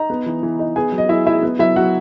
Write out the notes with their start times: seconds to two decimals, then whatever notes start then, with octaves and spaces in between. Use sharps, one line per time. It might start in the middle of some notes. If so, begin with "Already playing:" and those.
Already playing: D#4 A#5
0.10 B3
0.26 E3
0.43 E3
0.59 D#4
0.76 B3 G#4 G#5
0.92 F#3
0.98 D#5
1.09 F#3 E4 E5
1.26 D#4 E4 E5
1.43 B3
1.59 F#3 E4 E5
1.76 F#3 F#4 F#5